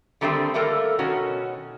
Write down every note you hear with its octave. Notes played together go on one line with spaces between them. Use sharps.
D3 D#3 G3 A3 A#3 C4
G3 A3 A#3 A4 A#4
B2 D#3 C#4 F#4